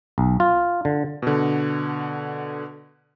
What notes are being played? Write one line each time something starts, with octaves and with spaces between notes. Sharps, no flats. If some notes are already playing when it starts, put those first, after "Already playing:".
B1
F4
D3
B2 D3